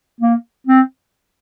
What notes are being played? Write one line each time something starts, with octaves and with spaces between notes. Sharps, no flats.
A#3
C4